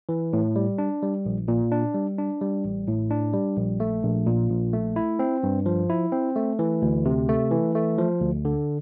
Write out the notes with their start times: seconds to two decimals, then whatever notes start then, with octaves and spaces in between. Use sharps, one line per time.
0.09 E3
0.33 A2
0.56 G3
0.78 D4
1.02 G3
1.25 A#1
1.48 A#2
1.72 D4
1.95 G3
2.18 D4
2.41 G3
2.65 A1
2.88 A2
3.11 D4
3.34 G3
3.57 A#1
3.80 A3
4.03 A#1
4.26 A#2
4.50 A#1
4.73 A3
4.96 E4
5.19 C4
5.43 G2
5.66 F3
5.90 E4
6.12 C4
6.36 A3
6.59 E3
6.82 D2
7.05 C3
7.29 A3
7.51 E3
7.75 A3
7.98 F3
8.21 D2
8.45 D3